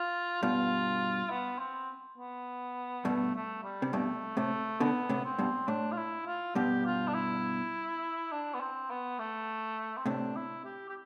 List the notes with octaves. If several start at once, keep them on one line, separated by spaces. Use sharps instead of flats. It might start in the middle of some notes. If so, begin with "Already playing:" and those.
Already playing: F4
G2 B2 F4
B3
C4
B3
G2 B2 A3
A3
G3
C3
G2 B2 A3
A2 C3 A3
B2 D3 B3
A2 C3
C4
G2 B2
A2 D4
F4
E4
F4
G2 B2 G4
F4
D4
E4
D4
B3
C4
B3
A3
C4
A2 C3 D4
E4
G4
G4